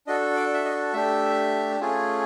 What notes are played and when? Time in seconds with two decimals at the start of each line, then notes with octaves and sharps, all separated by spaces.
0.07 D4 F#4 A4 D#5
0.36 D5
0.54 E5
0.65 D#5
0.93 A3 D4 G4 E5
1.80 A3 C#4 F4 G#4